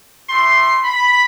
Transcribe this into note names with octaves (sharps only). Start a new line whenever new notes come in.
A3 E4 G4 C6
B5